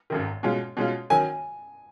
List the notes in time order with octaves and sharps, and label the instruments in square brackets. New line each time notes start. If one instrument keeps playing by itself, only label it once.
[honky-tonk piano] G#1 F#2 D#3
B2 G#3 C#4 F4
B2 G#3 C#4 F4
[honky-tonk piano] D#3 F#3 C#4 [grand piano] G#5